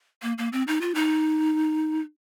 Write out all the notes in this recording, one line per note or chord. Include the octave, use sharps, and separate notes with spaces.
A#3
A#3
C4
D#4
F4
D#4